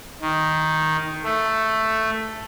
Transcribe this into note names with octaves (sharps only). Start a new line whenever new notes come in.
D#3
A3